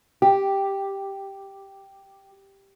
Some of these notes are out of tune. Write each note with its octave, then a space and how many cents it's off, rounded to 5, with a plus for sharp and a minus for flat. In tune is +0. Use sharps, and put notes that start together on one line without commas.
G4 +0